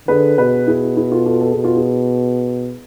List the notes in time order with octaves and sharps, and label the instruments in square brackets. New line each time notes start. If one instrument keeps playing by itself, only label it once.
[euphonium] D3 [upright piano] G#4 B4
[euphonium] B2 [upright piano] G#4 B4
[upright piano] E4 G#4
E4 G#4
F4 A4
F4 A4
A4
[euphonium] B2 [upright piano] G#4
[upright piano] F4
E4 G#4